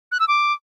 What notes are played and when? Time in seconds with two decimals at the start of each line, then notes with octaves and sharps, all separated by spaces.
0.12 F#6
0.20 E6
0.28 D6